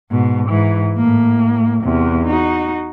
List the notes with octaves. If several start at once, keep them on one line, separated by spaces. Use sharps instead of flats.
G#2 B2
G#2 E3
A2 A#3
E2 C3
D#4 F#4